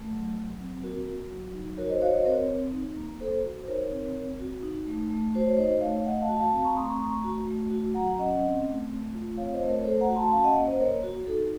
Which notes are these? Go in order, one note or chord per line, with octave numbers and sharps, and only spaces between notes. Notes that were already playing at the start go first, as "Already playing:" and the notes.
Already playing: A3
F#3
F#3
C4
A#3 F#4 A#4
F#4
F#3
D#4
F#4 A#4 C#5
C5 D#5
F#4 C#5 F5
C5 D#5
C4 A#4 C#5
C4
D#4
A#3
A#3 A4 C5
F#4
C5
D#4 A#4 C#5
C4
C4
F#4
D#4
A3
A3
F#4 C5
C#5
D#4 C5 D#5
A3 C#5 F5
A3 D#5 F#5
F5 A5
F#4
F5 A5
C4 F5 A5
A#5 C#6
A3 C6 D#6
A#5 C#6
A3 A#5 C#6
F#4
A3
F#4
F#3 F#5 A#5
C#4 D#5 F#5
C4
A3
A3
F4
C4 C#5 F5
C5 D#5
A3
A#4 C#5
A3 A4 C5
F#5 A#5
F#4
A5 C6
C#4 F5 A5
D#5 F#5
A#3
C5 D#5
A#3 A#4 C#5
F#4
D#4 A4